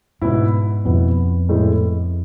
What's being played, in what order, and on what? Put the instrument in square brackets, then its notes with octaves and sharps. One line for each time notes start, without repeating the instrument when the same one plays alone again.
[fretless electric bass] G#2 [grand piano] B2 B3 E4
[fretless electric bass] F2 [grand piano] B2 B3 E4
[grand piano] A2 G#3 B3 E4